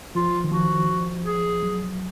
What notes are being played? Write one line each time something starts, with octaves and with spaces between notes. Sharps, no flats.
F3 F4
D#3
F3 F#4
G#4
F#3